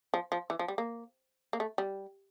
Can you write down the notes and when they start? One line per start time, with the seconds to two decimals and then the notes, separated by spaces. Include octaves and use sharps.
0.14 F3
0.32 F3
0.50 E3
0.59 F3
0.68 G3
0.78 A#3
1.53 A#3
1.60 A3
1.78 G3